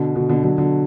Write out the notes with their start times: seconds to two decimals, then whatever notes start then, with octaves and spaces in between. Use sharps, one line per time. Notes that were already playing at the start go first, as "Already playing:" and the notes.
Already playing: B2 D3
0.15 B2 D3
0.29 B2 D3
0.44 D3 F#3
0.58 B2 D3